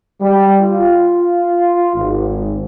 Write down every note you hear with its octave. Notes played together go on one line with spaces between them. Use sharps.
G3
F4
G#1